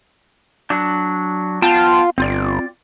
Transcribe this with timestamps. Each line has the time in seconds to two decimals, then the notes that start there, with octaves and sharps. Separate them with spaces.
0.70 F#3 D4
1.62 B3 F4 G5 A5
2.18 G1 C4 F4 D5